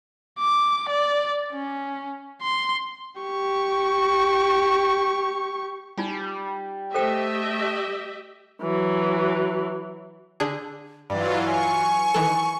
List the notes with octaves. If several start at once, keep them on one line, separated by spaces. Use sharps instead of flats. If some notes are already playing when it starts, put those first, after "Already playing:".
D6
D5
C#4
C6
G4 C#6
G3 D#4 F4 G#5
A3 G4 A4 C5 D#5 E5 G5
E3 F#3
D3 D4 G#4
G2 E3 F#3 F4 D5
G#5 C#6
D#3 E3 A4